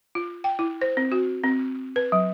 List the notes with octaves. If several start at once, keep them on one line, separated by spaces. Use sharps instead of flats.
F4
G5
E4
C5
C4
F#4
C4
B4
F#3